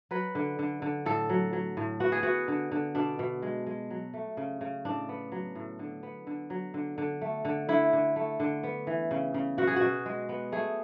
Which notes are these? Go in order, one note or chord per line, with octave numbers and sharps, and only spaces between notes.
F#3 B4
D3
D3
D3
A2 A4
F#3
F#3
A2
B3 F#4
G#4
B3 F#4
D3
D3
B2 D4
B2
G#3
G#3
F#3
A3
C#3
C#3
A2 D4
B3
F#3
A2
D3
B3
D3
F#3
D3
D3
A3
D3
D3 E4
D3
A3
D3
B3
E3
C#3
C#3
B2 F#4
G#4
F#4
B2
G#3
B3
A3 G#4